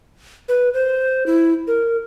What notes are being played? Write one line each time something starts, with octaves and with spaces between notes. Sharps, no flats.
B4
C5
E4
A#4